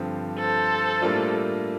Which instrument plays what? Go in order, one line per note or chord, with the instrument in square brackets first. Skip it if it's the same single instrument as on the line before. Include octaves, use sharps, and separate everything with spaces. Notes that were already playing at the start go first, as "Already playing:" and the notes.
Already playing: [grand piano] G2 D3 F3 C4 G4
[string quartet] A4 C5
[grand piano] A2 G3 A#3 D4 F4